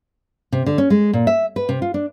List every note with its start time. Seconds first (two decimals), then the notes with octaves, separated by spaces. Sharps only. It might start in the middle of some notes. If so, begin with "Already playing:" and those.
0.52 C3
0.66 D3
0.78 C#4
0.90 G#3
1.13 A#2
1.27 E5
1.56 B4
1.69 C3
1.82 F4
1.94 D4